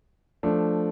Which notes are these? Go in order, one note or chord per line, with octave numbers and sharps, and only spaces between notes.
F3 A3 D4